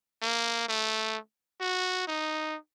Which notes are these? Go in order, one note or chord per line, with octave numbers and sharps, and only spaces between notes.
A#3
A3
F#4
D#4